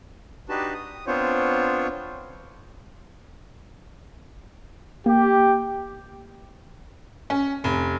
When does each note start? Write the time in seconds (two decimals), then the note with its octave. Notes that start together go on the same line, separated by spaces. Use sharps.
0.49 D4 D#4 F#4 G4 B4 A5
0.74 D#6
1.07 B3 C4 D4 F4 C5 C#5
5.06 A#3 G4
7.30 C#4
7.64 F1